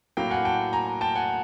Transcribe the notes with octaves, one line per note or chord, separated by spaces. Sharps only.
A2 F#3 A#3 F5 G5
F#5 G#5
G5 A5
G#5 A#5
G5 A5
F#5 G#5